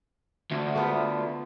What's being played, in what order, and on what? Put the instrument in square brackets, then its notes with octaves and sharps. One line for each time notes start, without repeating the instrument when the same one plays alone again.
[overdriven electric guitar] D2
[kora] A3 B3 F4